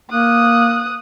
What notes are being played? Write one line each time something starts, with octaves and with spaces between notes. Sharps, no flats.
A#3 D#6 F#6